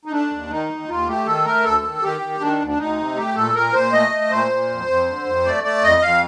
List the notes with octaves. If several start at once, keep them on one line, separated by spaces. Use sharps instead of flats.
D#4
A3 D4
D#2
D#3 D#4
D#2
D#2 F4
A3 G4
D#3 A4
A3 A#4
D2 A4
D#3
D#3 G4
D#3
D#3 D4
D2
D4
D2 D#4
C3
A3 G4
A#2 A4
A#2 A#4
A#2 C5
A3 D#5
A3
A#2 C5
A#2
F2
F2
D3
F2
A3 D5
A3 D5
F2 D#5
F2 F5